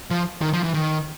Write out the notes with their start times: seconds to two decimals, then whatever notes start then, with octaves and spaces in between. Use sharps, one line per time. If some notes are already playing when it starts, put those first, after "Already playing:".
0.11 F3
0.42 D#3
0.53 F3
0.64 E3
0.74 D#3